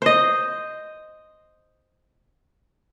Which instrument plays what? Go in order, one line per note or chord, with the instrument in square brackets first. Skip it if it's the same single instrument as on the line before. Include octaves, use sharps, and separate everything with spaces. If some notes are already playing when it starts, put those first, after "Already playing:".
[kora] C5 D#5